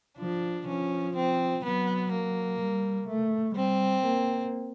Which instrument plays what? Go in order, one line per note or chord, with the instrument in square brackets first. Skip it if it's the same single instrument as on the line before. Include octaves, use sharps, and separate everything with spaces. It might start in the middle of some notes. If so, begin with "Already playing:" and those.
[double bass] F3 [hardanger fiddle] D4
[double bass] F3 [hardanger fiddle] C#4
[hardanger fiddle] C4
[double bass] F#3 [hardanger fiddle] B3
[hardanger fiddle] A#3
[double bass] G3
A3
[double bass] G3 [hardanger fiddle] C4
[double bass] A#3